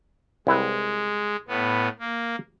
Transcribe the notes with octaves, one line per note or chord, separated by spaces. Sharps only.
C2 G#3 E4 B4
A2 B3
A#3